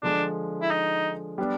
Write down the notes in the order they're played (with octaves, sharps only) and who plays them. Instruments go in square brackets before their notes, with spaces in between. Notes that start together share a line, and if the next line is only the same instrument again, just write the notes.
[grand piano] D3 F3 G#3 [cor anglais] D4
[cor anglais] E4
D#4
[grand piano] G3 B3 D4